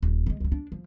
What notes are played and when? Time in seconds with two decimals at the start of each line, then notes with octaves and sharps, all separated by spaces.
0.03 D#1
0.26 C#3 G#3
0.40 C#2 F#3
0.52 D4
0.72 F3